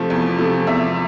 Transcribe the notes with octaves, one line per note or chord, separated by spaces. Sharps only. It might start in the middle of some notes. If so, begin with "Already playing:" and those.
Already playing: C3 F3 A3
E2
C3 F3 A3
E2 E5